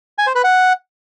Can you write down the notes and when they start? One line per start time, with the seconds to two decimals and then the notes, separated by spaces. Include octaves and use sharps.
0.18 G#5
0.27 C5
0.35 B4
0.44 F#5